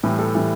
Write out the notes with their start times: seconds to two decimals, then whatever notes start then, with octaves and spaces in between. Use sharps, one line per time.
0.03 A2 E3 G3
0.19 A4
0.35 A2 E3 G3